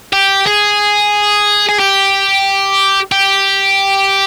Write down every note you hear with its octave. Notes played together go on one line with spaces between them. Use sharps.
G4
G#4
G#4
G4
G4